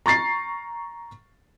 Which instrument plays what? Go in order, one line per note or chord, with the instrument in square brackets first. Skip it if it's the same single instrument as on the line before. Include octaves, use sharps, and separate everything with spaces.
[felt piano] A#5 C#6 A6 C7